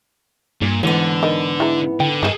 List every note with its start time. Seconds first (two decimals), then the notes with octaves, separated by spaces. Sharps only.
0.62 G2 A#2
0.83 G#2 D3 E3 B3
1.23 D#4 A#4
1.60 E3 G#3 E4 A#5
2.00 D3 G5
2.23 G2 D#3 D4 D#4 G#4 A4